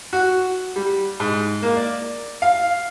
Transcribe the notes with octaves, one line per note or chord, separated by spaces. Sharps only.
F#4
G3
G#2
A#3
D5
F5